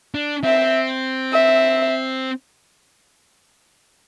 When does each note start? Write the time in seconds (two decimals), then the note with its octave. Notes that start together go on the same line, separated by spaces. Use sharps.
0.14 D4
0.44 C4 E5
1.33 E5